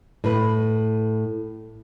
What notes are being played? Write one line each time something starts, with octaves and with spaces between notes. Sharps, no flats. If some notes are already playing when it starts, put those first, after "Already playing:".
A2 B4